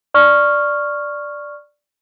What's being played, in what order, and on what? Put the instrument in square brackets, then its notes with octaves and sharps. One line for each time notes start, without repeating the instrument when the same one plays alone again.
[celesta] D5 C#6 F6